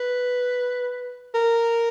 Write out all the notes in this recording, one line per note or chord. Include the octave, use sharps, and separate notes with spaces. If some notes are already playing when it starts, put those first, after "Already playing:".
Already playing: B4
A#4